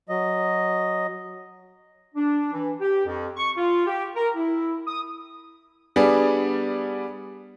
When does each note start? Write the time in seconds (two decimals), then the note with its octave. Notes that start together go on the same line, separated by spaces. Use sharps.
0.09 F#3 D#5
2.15 D4
2.52 E3
2.81 G4
3.05 F2
3.37 C#6
3.57 F4
3.86 G4
4.16 A#4
4.36 E4
4.87 D#6
5.96 G3 B3 D4 G#4